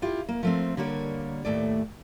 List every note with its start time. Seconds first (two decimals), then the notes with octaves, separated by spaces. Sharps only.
0.02 E4 F4 G4
0.29 A#3
0.43 F3 A3 C4
0.77 D3 G3 A#3 C#5
1.45 D#2 A2 A3 D5